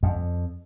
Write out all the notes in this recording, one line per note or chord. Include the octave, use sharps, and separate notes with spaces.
F2